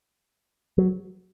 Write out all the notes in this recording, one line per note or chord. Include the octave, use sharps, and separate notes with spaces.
F#3